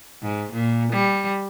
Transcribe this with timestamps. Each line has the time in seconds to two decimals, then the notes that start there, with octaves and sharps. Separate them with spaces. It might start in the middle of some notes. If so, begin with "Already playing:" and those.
0.22 G#2
0.52 A#2
0.92 G3